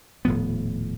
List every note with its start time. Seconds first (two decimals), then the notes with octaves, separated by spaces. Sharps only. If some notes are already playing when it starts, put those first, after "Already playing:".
0.25 D#1 A2 F3 B3